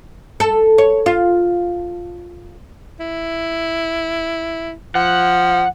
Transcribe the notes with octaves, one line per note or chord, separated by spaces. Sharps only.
A4
C#5
F4
E4
F3 F#5